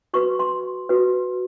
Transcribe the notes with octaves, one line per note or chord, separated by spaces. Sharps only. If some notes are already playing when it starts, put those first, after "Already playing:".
F#4 B4 C#6
C6
F#4 B4